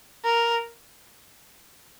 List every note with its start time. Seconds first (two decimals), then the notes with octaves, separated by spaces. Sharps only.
0.24 A#4